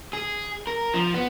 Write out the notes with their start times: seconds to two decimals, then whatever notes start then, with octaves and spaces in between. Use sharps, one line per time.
0.13 G#4
0.67 A#4
0.94 F3
1.14 B3